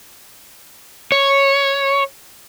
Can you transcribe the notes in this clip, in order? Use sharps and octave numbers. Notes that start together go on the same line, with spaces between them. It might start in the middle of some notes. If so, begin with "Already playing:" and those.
C#5